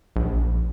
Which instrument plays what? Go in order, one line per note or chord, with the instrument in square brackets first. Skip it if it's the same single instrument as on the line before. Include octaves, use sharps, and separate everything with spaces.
[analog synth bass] A#1